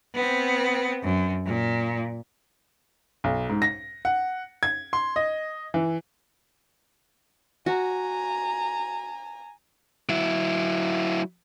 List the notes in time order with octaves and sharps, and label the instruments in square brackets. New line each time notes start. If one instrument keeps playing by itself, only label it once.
[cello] B3 C4
F#2
A#2
[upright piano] B1
G#2
A#6
F#5
G#6
C6
D#5
E3
[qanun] F#4 [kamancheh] G#5 A#5
[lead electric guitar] F#3 E4